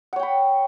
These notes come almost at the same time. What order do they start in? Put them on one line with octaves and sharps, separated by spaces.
F#5 C#5 G5 B5